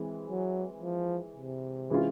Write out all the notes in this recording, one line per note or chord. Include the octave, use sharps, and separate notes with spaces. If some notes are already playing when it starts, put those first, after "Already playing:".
Already playing: E3 G#3 C4
F#3
F3
C3
E3 G#3 C#4 F4